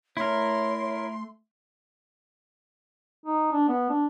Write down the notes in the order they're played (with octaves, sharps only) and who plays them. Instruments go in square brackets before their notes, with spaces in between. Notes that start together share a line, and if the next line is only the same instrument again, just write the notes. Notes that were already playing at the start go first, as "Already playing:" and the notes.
[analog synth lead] A3 [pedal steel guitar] E4 A#4 [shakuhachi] C#5 [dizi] C6
[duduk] D#4
D4
B3
D4